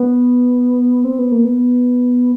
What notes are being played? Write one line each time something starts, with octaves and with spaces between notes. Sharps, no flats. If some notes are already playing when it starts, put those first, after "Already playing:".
Already playing: B3
C4
B3
A#3
B3